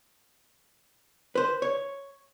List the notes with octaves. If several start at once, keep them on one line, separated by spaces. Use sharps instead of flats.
B4 C5
C#5